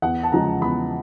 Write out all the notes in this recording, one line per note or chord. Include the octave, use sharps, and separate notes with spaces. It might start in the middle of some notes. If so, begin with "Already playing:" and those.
E2 F#5
A5
C#3 F3 G#3 A#5
E2 B5